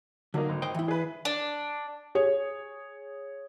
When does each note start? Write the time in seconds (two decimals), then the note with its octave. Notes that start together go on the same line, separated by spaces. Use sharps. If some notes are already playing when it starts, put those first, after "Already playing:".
0.34 D3 F#3 A#3 D#4
0.49 G#1
0.62 C5 D#5 G5
0.75 E3 E4
0.88 G#4 B4
1.25 D4
2.15 G#4 C#5